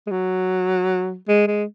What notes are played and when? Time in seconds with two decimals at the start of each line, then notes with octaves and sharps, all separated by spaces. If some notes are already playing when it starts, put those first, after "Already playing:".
0.07 G#3
0.11 F#3
1.28 G#3
1.47 G#3